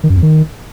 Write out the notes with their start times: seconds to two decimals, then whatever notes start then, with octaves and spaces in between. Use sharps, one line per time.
0.03 D#3
0.10 F#2
0.16 F2
0.22 D#3